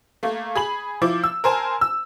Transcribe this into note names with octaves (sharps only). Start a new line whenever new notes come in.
A3 A#3
G#4 B5 F#7
F3 E4 D6
E6
A#4 C5 G#5 A5
E6